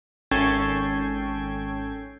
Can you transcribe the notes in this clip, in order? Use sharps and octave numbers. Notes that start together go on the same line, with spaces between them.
G#1 C#4 A4 G5 G#6 C7